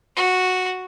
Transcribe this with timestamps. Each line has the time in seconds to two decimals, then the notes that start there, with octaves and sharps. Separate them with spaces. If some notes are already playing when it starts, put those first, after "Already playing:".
0.16 F#4